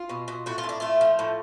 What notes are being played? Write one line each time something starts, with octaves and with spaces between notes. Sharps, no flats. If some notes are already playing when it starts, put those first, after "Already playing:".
Already playing: F4
B2
B2
A2 F#4
F4
A2
D4
A3 F4
F3
A2